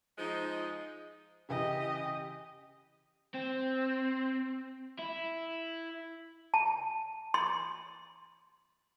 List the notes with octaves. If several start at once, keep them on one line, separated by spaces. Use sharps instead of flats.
F3 G#3 D#4
C#3 E3 G4 D#5
C4
E4
A5
C6